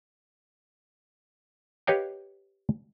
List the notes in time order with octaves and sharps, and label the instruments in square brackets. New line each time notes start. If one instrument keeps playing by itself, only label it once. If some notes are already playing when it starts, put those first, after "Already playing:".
[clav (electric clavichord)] G4 B4 C#5 D#5 F5 G5